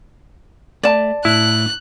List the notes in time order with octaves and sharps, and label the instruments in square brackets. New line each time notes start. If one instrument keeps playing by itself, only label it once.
[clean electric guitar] A3 [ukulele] D5 A5
[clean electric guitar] A2 [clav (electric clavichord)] E4 [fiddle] F#6